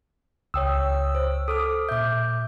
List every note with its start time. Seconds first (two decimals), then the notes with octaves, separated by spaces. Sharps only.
0.54 C#2 C#5 G5 D#6 E6
1.15 C5
1.48 A4 D6 D#6 F6
1.89 A#2 E5 D6 G6